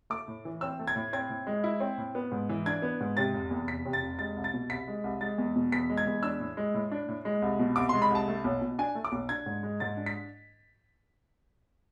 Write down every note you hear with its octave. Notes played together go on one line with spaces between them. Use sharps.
A3 D6
A2
E3
C4 E6
A3
G#6
A2
C4 G#6
A2
G#3
E4
C4
A2
B3
G#2
E3
D4 G#6
B3
G#2
C3 A6
F1
E2
F1 B6
C3
A6
F1
G#3 A6
C2
A6
B2
C2 B6
G#3
C2
G#3 A6
E2
B2
E2 B6
G#3
G#6
E2
D4 E6
A2
G#3
A2
D4
A2
G#3
C2
B2
C2 D6
C6
G#3
B5
C2 A5
A3
B1
B2
D4 G#5
A3
D6
B1
D4 G#6
G#2
G#3
G#2 A6
D4
B6